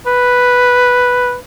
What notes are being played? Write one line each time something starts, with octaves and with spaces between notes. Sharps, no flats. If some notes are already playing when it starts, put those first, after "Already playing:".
B4